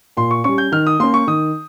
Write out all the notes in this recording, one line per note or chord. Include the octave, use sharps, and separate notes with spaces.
A#2 C6
C#6
G3 C#4 C#6
G6
D#3 F6
D#6
A#3 C#4 C6
C#6
D#3 D#6